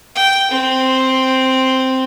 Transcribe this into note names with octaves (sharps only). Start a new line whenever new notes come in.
G5
C4